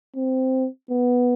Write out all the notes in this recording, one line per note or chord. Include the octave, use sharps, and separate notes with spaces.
C4
B3